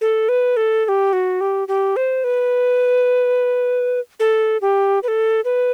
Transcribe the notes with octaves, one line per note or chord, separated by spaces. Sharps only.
A4
B4
A4
A4
G4
F#4
G4
G4
C5
B4
A4
G4
B4
A4
B4